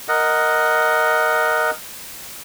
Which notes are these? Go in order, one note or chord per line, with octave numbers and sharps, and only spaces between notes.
A#4 D#5 F#5